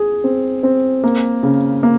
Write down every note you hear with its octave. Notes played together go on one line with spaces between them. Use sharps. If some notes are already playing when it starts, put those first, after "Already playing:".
Already playing: G#4
C4
C4
A#3
C#3
A#3